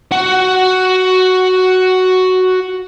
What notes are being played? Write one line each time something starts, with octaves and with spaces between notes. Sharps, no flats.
F#4 F#5